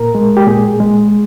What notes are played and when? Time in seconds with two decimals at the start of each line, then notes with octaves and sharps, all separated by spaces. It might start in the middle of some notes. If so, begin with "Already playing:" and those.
Already playing: A#2 A#4
0.15 G#3
0.37 G4
0.47 A#2 G#4
0.80 G#3